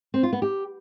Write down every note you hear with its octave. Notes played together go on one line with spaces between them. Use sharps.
C4
F4
B3
G4